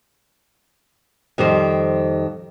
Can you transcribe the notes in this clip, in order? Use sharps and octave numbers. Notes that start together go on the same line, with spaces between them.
F2 D#3 G3 C5